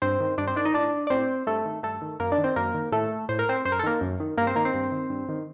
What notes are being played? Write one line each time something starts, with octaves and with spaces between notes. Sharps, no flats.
G2 C4 C5
D#3
G2 D4 D5
C4 C5
D#3 D4 D5
D#4 D#5
A2 D4 D5
D5
A2 C4 C5
G2 A3 A4
D#3
G2 A3 A4
D#3
F#2 A#3 A#4
D4 D5
D#3
C4 C5
F#2 A#3 A#4
D#3
A2 A3 A4
A2 C5
A#4
C4 C5
F#2 C5
A#4
A4
D#3 A#3 A#4
F#2
D#3
G2 A#3 A#4
C4 C5
D#3 A#3 A#4
C4 C5
G2
D#3
G2
D#3